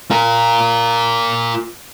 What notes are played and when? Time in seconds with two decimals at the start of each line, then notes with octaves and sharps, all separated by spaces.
0.11 F4 A#4